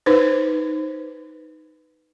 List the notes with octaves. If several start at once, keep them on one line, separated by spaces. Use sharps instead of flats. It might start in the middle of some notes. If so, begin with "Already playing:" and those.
D#4 B4 C5